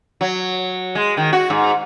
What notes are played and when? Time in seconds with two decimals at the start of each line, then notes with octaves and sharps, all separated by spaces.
0.21 F#3
0.95 G#3
1.17 D#3
1.33 F#4
1.50 G#2